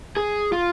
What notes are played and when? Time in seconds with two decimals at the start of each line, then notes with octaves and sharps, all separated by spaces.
0.17 G#4
0.52 F4